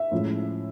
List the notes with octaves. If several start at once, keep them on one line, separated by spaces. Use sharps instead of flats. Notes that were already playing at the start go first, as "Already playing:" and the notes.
Already playing: E5
A2 F3 G#3 C#4 E4